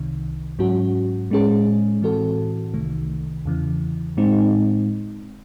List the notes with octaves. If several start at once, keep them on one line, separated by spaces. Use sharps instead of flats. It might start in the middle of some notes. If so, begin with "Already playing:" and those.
Already playing: C2 C3 D#3
G#2 F#3 C#4 F#4
A2 G#3 C#4 G#4
A2 E3 C4 F#4 A4
C2 C3 D#3 A3
E2 C#3 E3
A2 G#3 C4 D#4